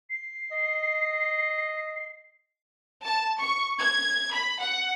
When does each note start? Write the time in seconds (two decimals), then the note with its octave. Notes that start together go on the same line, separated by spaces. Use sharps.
0.10 C7
0.52 D#5
3.02 A5
3.38 C#6
3.78 G#6
4.31 B5
4.59 F#5